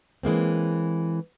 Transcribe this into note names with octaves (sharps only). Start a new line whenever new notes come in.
E3 G#3 A#3 C4